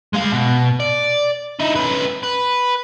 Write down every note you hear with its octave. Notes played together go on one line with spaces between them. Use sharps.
G#3 F5
B2
D5
D#4 E4
C#4 B4
B4